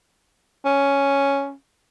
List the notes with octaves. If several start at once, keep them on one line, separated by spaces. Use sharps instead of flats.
C#4